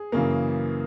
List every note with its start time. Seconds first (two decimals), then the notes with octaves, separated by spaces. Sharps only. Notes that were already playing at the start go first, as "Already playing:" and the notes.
Already playing: G#4
0.12 F#2 C#3 E3 A#3